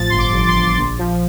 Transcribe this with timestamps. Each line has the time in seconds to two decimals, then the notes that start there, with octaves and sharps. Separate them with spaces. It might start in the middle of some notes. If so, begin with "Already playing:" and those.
Already playing: A1 F3 A6
0.10 G1 C6
0.18 D6
0.32 G1
0.48 C6
0.54 G1
0.77 A#1
0.98 F3